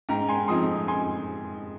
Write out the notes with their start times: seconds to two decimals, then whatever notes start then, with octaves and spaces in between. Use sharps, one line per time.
0.09 G#2 G5 A#5
0.28 G#5 C6
0.48 F3 C4 D#4 C6 D#6
0.88 G#5 C6